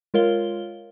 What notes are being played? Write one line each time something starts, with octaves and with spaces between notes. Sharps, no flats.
G#3 F4 A#4 C#5 F5 G7